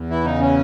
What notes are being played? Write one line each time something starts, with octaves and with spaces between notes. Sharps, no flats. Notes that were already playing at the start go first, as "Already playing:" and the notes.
Already playing: E2
E3 E4
C#3 D#4
C#4